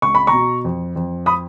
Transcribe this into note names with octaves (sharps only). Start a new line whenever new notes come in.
C#2 C#6
B5
A#5 C#6
B2
F2
F2
B5 D#6